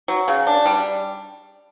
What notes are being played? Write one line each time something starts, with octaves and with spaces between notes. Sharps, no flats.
F#3
C#3
D4
G3